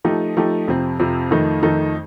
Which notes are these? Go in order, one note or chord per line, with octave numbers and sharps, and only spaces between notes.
F3 A3 D#4 G4
F3 A3 D#4 G4
F2 C3 F3 C4
F2 C3 F3 C4
F2 D#3 A3 D#4 A4
F2 D#3 A3 D#4 A4